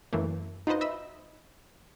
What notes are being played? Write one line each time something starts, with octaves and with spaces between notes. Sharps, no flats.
F#2 E3 A3 A#3
D#4 F4 F#4 B4 C5 D#5
D#5 E5 B5 E6